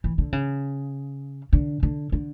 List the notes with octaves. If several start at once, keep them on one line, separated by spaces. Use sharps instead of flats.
E3
D3
C#3
D3
D3
D3